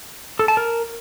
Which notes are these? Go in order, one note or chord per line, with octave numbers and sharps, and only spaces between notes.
A4
A5
A#4